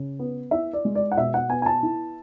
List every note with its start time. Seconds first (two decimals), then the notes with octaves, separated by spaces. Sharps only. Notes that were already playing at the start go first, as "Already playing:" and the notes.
Already playing: C#3
0.19 B3
0.51 E4 E5
0.73 D5
0.85 G#3
0.95 D5
1.12 F#5
1.17 B2 E5
1.34 F#5
1.49 B3 G#5
1.62 G#5
1.66 A5
1.83 E4